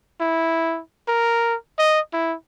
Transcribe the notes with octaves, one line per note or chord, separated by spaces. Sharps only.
E4
A#4
D#5
E4